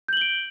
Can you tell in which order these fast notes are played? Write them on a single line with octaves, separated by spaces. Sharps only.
G6 F#7 G7 D7